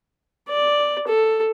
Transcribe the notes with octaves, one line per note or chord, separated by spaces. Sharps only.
D5
A4